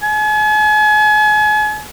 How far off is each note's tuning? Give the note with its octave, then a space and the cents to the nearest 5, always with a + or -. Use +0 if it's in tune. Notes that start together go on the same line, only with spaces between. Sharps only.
G#5 +40